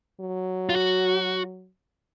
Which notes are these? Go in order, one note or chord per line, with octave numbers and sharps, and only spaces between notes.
F#3
F4
F#4